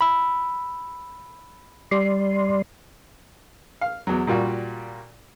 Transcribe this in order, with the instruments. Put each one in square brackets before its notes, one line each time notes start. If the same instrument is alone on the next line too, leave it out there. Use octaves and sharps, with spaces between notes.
[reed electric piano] B5 E6
[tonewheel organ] G3 D5 C6
[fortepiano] F5
E2 F#3
A#2 G3 F4 F#4